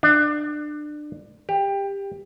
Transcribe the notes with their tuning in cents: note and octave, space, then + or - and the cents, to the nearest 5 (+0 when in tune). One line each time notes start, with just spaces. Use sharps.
D4 +25
G4 +20